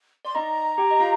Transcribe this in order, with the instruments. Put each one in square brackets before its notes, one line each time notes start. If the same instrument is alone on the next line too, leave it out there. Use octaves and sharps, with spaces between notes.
[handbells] D5 [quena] C6
[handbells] D#4 D#5 [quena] A#5
[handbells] G4 G5
D#5
F4 F5